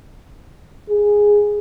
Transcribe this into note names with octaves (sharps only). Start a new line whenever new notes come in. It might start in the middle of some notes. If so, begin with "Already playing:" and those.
G#4